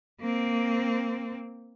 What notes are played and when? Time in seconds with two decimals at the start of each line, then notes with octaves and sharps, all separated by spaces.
0.21 A#3 C4